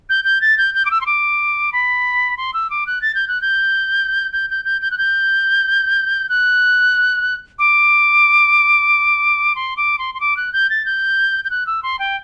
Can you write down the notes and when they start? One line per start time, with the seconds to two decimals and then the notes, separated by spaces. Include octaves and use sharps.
0.09 G6
0.25 G6
0.41 A6
0.58 G6
0.75 G6
0.85 D6
0.91 E6
1.01 C6
1.06 D6
1.73 B5
2.37 C6
2.54 E6
2.70 D6
2.87 F#6
3.02 A6
3.15 G6
3.28 F#6
3.42 G6
4.33 G6
4.50 G6
4.65 G6
4.81 G6
4.91 F#6
4.98 G6
6.29 F#6
7.59 D6
9.55 C6
9.77 D6
9.99 C6
10.14 C6
10.20 D6
10.37 F#6
10.53 G6
10.70 A6
10.85 G6
11.44 G6
11.50 F#6
11.67 E6
11.83 C6
11.99 G5